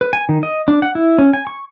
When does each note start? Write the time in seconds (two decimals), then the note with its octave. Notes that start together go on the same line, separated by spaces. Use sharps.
0.01 B4
0.13 G#5
0.29 D#3
0.43 D#5
0.68 D4
0.82 F#5
0.95 E4
1.18 C#4
1.33 G#5
1.47 C#6